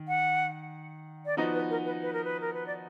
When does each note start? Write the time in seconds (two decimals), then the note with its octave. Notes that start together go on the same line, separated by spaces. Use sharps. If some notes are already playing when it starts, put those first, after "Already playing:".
Already playing: D#3
0.08 F#5
1.26 D5
1.37 F3 B3 D#4 F#4 D#5
1.54 B4
1.70 A#4
1.86 B4
2.02 B4
2.13 A#4
2.24 B4
2.41 A#4
2.54 B4
2.67 D5